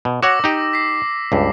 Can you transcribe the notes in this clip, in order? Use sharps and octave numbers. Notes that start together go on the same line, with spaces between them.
B2
F#4 C#5 F#5 D6 E6 A#6
D#4 G4
B6 C7
C#2 G2